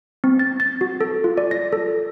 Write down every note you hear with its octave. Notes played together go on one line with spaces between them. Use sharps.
C4
A6
A6
F#4
A4
F4
D5
A#6
A4